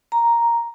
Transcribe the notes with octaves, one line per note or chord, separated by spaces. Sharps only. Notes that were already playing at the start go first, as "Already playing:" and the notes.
A#5